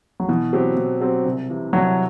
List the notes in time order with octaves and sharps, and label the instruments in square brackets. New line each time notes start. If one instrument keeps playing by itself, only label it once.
[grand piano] F#3
[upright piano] B2 [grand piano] E3
[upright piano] F#3 C4 G4
B2
F#3 C4 G4
C2
C3 E3
[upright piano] C2 [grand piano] F#3